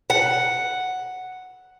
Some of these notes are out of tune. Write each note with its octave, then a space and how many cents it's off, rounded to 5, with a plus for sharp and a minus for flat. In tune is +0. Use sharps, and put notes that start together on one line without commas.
F#5 +0